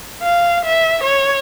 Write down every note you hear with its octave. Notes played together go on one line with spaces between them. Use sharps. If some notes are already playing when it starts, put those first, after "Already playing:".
F5
E5
C#5